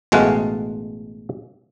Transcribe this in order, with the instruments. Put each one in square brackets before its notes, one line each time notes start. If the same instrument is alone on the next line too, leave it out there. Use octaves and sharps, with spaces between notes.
[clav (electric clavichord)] A1 B2 G#3 A3 F5 F#5